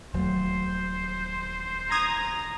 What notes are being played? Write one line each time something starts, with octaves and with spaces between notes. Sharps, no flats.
D#1 F#3 A3 C5
A#5 D#6 G#6 A#6